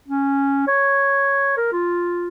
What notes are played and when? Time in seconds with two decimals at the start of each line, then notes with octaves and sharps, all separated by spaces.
0.08 C#4
0.67 C#5
1.57 A#4
1.72 F4